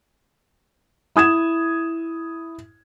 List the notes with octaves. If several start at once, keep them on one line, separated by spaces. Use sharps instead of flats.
E4 D#6 G#6 E7